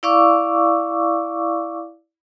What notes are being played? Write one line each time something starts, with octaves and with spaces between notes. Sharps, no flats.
E4 D5 F5 C#6 D6 E6